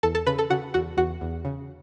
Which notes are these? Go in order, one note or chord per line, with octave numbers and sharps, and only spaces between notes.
E2 A4 A5
A4 A5
C#3 B4 B5
A4 A5
C#3 F#4 F#5
E2 F#4 F#5
E2 F#4 F#5
E2
C#3